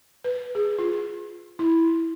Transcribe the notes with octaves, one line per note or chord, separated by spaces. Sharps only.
B4
G#4
F4
E4